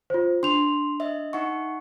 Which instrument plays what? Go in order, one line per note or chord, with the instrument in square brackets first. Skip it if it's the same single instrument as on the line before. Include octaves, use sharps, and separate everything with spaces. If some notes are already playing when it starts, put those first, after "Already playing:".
[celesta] F4 C5
[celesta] D4 F7 [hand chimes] C6
[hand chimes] D#5 E5
D#4 F#5 C#6